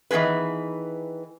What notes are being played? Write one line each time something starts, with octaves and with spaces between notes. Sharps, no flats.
D#3 E3 B3 G#4 B4